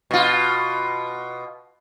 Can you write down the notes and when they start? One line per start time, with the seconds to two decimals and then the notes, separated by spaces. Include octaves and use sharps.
0.11 B2 F4